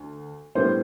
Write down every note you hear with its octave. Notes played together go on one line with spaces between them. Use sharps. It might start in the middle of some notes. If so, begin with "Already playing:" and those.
Already playing: D2 D3
A2 G3 B3 D4 C5